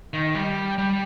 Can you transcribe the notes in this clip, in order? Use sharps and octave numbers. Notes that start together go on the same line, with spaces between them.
D#3
G3
G3